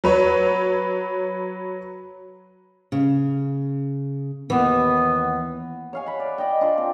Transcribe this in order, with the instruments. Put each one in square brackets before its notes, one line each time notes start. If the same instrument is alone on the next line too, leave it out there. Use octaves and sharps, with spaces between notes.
[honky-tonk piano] F#3 B4 C#5
[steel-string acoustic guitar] C#3
[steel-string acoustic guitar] D#2 E3 [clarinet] B3
[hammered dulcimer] C#5 F5 G#5
F#5 B5
D5
D5 D#5 G5
D4 F4 D5
C4